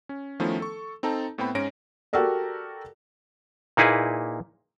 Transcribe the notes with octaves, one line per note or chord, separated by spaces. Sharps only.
C#4
D#3 F3 A3 B3 C#4 E4
A4 C#6
C4 D#4 A4 A5 A#5
A2 B3 C4 G5 B5
G#2 C#4 C#5 A#6 D7
F#4 G4 A4 A#4 D5
A#2 A#3 D#4 E4 G#4 B4